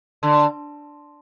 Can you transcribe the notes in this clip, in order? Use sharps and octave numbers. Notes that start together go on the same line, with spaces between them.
D3